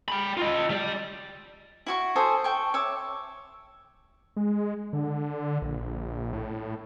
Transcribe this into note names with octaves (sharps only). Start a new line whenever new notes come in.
G5 B5
F4 D#5
G3 D5
E4 F#4 C#6
A4 C5 G#5 D#6
A4 G5 C#6
C#5 E5 D6
G#3
D3
A#1
A2